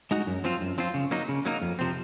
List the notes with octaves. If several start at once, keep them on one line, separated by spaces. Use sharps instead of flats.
G#3 D#4 F#4
F#2
F3 C4 F4
F#2
F3 C4 F4
C#3
F#3 A#3 D#4
C#3
F#3 A#3 D#4
F2
C3 F3 C4